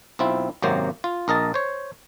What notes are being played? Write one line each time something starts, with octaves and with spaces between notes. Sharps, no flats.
B1 C4 E4 F4
G#1 F#2 C3 F#3 A#3 C5
F4
A#1 A#4 D#5 A5
C5 C#5